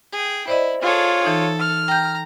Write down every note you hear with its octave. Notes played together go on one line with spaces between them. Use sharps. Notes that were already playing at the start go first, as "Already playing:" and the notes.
G#4 G5
E4 C5 D5 D#5
F4 G#4 A4 C#5
E3 D#4 A4
F6
G5 A#5 G6